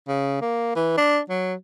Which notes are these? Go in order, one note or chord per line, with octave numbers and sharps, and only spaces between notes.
C#3
A#3
E3
D4
F#3